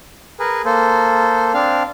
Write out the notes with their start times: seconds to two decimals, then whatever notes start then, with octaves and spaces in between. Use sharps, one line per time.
0.40 G#4 A#4 B4
0.65 A#3 A4 C5
1.54 C4 D4 F5